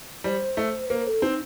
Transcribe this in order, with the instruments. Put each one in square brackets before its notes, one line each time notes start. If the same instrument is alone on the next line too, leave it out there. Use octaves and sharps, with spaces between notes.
[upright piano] G3 [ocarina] C5
[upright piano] A3
[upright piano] A#3 [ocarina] C5
[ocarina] A4
[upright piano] C4 [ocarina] D#4